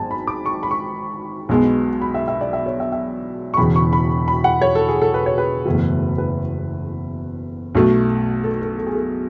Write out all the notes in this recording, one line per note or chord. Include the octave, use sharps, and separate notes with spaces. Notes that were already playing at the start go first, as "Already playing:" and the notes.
Already playing: G#1 G#2 F#3 B3 G#5 A5
B5
D6
C#6
B5
C#6
B1 B2 G#3 B3
B5
E5
E5
D5
E5
C#5
E5
E5
C#6
E1 E2 C#3 E3 B5
C#6
B5
B5
F#5
C#5
A4
G#4
A4
B4
C#5
B4
F#1 E2 B2 A3
B4
B1 B2 A3
A4
A4
A4
G#4
A4